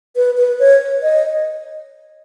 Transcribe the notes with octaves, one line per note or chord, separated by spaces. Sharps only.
B4
B4
C#5
D#5